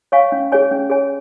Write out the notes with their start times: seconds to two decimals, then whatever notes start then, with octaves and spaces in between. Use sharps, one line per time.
0.12 C#5 F5 G#5 C#6
0.32 C#4
0.52 G#4 C#5 G#5
0.71 C#4
0.90 G#4 C#5 G#5